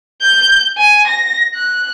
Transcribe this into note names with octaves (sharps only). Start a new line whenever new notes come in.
G6
G#5
A#6
F#6